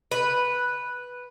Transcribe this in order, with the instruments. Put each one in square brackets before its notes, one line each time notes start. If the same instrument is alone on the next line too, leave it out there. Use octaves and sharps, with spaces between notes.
[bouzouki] B4